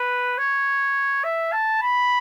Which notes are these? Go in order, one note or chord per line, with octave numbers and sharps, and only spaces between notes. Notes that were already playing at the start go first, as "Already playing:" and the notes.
Already playing: B4
C#5
E5
A5
B5